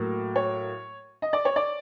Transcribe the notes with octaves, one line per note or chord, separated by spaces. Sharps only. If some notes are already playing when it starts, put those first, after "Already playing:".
Already playing: A2 F#3 A#3
C#5
D#5
D5
C#5
D5